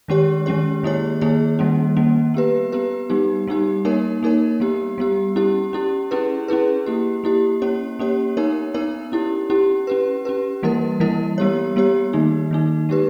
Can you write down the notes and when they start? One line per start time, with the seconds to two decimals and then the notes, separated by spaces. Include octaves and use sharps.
0.08 D#3 G#3 C#4 G4 C#5
0.46 D#3 G#3 C#4 G4 C#5
0.83 D#3 A#3 E4 G#4 C#5
1.21 D#3 A#3 E4 G#4 C#5
1.59 D#3 G3 A#3 C#4
1.97 D#3 G3 A#3 C#4
2.34 B3 G4 B4
2.72 B3 G4 B4
3.09 G3 B3 D#4 G4
3.47 G3 B3 D#4 G4
3.85 A#3 D#4 A#4 C#5
4.23 A#3 D#4 A#4 C#5
4.60 G3 B3 G4
4.98 G3 B3 G4
5.36 C#4 E4 G4
5.73 C#4 E4 G4
6.11 C#4 E4 G#4 B4
6.48 C#4 E4 G#4 B4
6.86 A#3 E4 G4
7.24 A#3 E4 G4
7.62 A#3 C#4 G4 C#5
7.99 A#3 C#4 G4 C#5
8.37 B3 D#4 A#4 C#5
8.74 B3 D#4 A#4 C#5
9.12 C#4 E4 G4
9.50 C#4 E4 G4
9.87 C#4 G4 B4
10.25 C#4 G4 B4
10.63 E3 G3 A#3 E4 A#4
11.00 E3 G3 A#3 E4 A#4
11.38 G3 B3 G4 C#5
11.76 G3 B3 G4 C#5
12.13 D#3 A#3 D#4
12.51 D#3 A#3 D#4
12.89 G#3 D#4 G4 B4